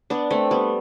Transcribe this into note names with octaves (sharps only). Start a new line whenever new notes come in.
B3 D4
A3 C4
G3 B3